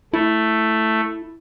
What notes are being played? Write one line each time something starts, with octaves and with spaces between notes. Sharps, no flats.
A3 E4